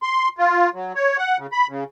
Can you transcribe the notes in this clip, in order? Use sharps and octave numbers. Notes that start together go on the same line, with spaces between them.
C6
F4
F#3
C#5
F#5
C#3
B5
C#3